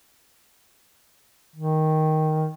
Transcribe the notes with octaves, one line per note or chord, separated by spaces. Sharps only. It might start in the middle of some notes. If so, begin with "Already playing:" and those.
D#3